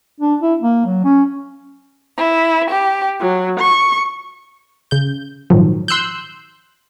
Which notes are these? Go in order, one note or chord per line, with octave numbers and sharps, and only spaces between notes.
D4
E4
A#3
F#3
C#4
E4
G4
F#3
C#6
C#3 G6
A#1 G#2 D#3 F3 F#3
C6 E6 F#6 G6